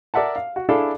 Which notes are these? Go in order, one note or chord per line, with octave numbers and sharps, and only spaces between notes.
A#4 D5 E5 F#5 A5
F5
F#4
D4 E4 G#4 A4 F5